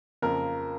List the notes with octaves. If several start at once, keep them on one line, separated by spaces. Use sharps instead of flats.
F2 C#3 F3 A#3 A#4